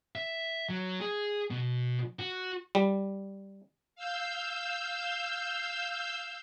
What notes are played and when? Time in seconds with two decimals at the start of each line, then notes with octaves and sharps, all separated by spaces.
0.15 E5
0.69 F#3
1.00 G#4
1.50 B2
2.19 F#4
2.75 G3
3.95 F5 E6 G6